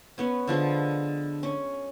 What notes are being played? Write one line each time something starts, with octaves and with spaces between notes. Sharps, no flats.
B3 C#4
D3 F3 G#3
C#4